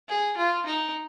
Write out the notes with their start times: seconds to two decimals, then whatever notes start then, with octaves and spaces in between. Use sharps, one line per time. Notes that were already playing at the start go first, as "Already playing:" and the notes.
0.09 G#4
0.37 F4
0.66 D#4